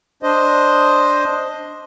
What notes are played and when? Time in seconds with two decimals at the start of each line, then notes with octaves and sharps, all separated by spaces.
0.23 D4 C5 D#5